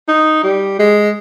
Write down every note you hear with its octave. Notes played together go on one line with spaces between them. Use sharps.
D#4
G3
G#3